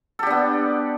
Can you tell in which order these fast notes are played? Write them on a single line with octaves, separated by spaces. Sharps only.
A4 G4 D4 B3